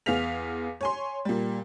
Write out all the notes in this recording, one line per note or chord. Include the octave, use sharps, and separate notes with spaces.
E2 B3 G#4 F5 B6 F7
C#5 G#5 C6
A#2 G3